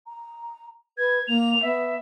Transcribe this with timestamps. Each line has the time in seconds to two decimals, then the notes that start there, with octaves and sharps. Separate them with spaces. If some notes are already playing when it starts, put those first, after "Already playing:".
0.07 A#5
0.98 B4 G#6
1.27 A#3 F7
1.62 B3 E5